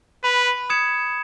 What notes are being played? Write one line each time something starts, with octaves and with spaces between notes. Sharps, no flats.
B4 B5
D#6 G#6 C#7 E7